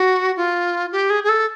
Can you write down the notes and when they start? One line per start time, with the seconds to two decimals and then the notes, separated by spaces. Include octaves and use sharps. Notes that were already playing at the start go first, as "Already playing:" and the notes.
Already playing: F#4
0.37 F4
0.92 G4
1.10 G#4
1.24 G#4
1.29 A4